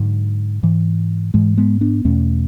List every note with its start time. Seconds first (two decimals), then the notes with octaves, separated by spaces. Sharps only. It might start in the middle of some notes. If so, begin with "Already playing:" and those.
Already playing: G#2 D3 F#3
0.63 G#2 E3
1.34 G#2 E3 G#3
1.58 G#3 B3
1.81 B3 D4
2.05 E2 B2 A3 C#4